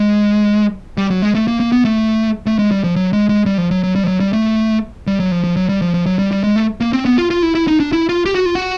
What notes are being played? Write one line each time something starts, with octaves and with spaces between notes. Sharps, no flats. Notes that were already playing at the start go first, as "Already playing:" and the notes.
Already playing: G#3
G3
F#3
G#3
A3
A#3
A#3
B3
A3
A3
G#3
G3
F3
F#3
G#3
G#3
G3
F3
F#3
F#3
G3
F3
F#3
G3
A3
G3
F#3
F3
F3
F#3
G3
F3
F3
F#3
G3
G3
G#3
A3
A#3
C4
B3
F4
F4
E4
E4
D#4
D4
E4
F4
G4
F#4
F4
F#4